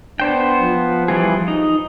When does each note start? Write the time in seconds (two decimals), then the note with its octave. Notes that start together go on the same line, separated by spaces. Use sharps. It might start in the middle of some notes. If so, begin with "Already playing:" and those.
0.20 B3 D4 C5 G5
0.61 F3
1.08 E3 G3 G#4
1.48 D#4